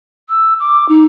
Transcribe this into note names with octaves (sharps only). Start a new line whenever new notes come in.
E6
D6
D#4